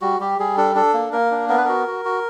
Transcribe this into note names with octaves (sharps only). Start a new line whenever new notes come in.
G3 F#4
G3 G4
G3 G#4
D4 A4
D4 A4
A#3
A#3 A#4
D4
B3 A#4
B4
F#4 A#4
F#4
F#4